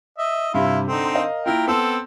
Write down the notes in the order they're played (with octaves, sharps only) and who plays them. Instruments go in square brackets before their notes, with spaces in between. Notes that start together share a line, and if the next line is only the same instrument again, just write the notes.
[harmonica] D#5 E5
[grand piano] G2 C3 [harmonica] E4 F4
[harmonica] D3 C4 D#4 [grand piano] A4
[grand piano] A#4 D#5 F5
[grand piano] A#3 E4 F4 [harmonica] A#4 G5
[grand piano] B3 E6 [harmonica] C4 A4